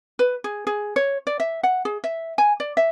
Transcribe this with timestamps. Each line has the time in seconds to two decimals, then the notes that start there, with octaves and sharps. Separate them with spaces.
0.19 B4
0.44 G#4
0.67 G#4
0.96 C#5
1.27 D5
1.40 E5
1.63 F#5
1.85 G#4
2.04 E5
2.38 G#5
2.60 D5
2.77 E5